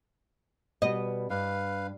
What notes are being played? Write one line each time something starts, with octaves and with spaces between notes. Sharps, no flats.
B2 G3 B3 D#5
G2 B4 F5